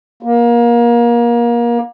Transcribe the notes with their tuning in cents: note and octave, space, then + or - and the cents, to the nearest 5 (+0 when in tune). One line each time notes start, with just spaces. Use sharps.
A#3 +25